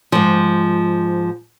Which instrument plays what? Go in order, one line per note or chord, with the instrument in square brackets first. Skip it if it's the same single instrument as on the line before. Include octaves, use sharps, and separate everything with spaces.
[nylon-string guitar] G#2 F3